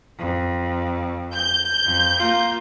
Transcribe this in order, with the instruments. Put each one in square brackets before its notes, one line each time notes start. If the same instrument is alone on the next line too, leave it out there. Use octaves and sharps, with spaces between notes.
[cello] F2
[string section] G6
[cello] F2
A#3 F4